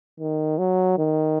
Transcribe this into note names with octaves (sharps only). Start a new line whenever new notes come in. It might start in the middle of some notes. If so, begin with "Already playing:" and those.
D#3
F#3
D#3